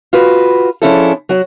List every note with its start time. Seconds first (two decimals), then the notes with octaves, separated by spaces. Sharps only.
0.13 F4 F#4 B4
0.82 F3 C#4 D4 E4 G#4 A4
1.29 F#3 F#4